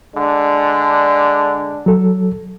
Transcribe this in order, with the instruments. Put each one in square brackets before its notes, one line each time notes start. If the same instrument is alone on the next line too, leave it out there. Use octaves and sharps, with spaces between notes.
[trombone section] D3 G#3 D4
[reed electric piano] F#3 A4